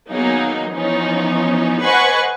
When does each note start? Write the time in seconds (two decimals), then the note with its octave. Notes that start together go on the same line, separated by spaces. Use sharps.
0.10 D#3 F#3 A#3 B3 D#4 G#4
0.72 E3 F3 B3 C#4 D#4
1.81 B4 C5 D#5 F#5 G#5 C#6